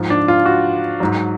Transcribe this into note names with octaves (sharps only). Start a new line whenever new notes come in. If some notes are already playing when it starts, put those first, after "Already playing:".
Already playing: G#2 F3
D4
F4
F#4
G#2 F#3